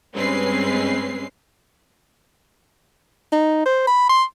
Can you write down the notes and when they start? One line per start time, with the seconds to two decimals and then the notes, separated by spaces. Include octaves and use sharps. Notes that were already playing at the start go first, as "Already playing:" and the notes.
0.14 G2 G#3 C4 C#4 B4 C7
3.32 D#4
3.66 C5
3.87 B5
4.09 C6